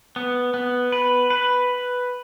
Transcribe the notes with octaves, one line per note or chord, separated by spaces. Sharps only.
B3
B3
B4
B4